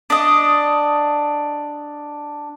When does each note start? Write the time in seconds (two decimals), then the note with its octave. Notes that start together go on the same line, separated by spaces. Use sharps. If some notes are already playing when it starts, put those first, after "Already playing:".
0.10 D4 D#5